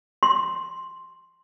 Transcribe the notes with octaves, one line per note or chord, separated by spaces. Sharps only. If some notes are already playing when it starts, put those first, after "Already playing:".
C6